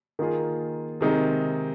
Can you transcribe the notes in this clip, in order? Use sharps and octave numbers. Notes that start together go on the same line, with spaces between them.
D#3 A#3 F4 G#4
C3 D#3 G#3 D#4